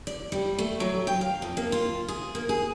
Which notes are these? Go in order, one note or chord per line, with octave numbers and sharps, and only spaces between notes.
D5
G3
A3
F#3
G5
F5
F2
A#3
F4
G#4
A#3
G#4